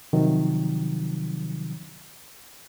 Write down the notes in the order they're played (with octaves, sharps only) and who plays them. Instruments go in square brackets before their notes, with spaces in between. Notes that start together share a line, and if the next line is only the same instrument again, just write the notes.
[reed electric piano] C3 D#3 F3 F#3